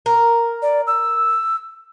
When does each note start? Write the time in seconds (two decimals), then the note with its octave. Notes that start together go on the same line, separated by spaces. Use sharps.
0.06 A#4
0.62 D5
0.87 E6